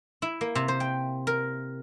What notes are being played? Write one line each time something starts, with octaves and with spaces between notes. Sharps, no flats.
E4
A#3
C3
C5
G5
A#4